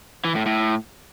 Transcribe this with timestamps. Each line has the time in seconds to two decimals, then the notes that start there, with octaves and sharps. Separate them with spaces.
0.25 E3
0.35 A2
0.46 A2